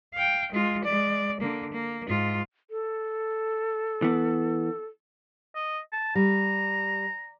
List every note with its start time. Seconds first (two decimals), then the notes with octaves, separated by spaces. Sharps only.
0.14 F5 G5
0.52 G#3 F4
0.84 G#3 D5
1.40 D3 A#3
1.73 A#3
2.08 G#2 F4
2.70 A4
4.02 E3 B3
5.55 D#5
5.92 A5
6.15 G3 A#5